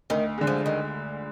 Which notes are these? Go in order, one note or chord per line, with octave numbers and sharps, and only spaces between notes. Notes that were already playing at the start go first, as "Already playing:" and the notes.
D2 D#3
D3 G#3
F3
D#3